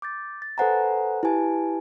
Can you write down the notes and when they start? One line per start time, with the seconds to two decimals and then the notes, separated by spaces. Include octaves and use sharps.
0.02 D6 G6 A6
0.42 A6
0.58 A4 B4 C5 F#5 G#5 A#5
1.23 E4 G4 B4 G#5 A5